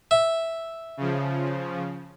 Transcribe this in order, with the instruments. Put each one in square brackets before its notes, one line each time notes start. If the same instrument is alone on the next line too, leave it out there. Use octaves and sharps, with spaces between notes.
[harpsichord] E5
[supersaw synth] C#3 F3